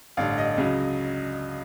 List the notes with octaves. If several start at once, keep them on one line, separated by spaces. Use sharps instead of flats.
A1 G2 D3 F5
D#5
C#2 C#3 F#3